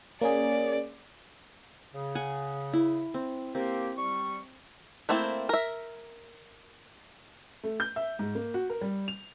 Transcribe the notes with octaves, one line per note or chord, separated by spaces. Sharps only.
A#3 C#4 G#4 D5
C#3
F#5 G#5
E4
C4
A#3 C4 G4
G3 C#6
A3 A#3 C4 E4
A#4 E5
A3
G6
E5
G#2
A#3
F#4
A#4
G3
F7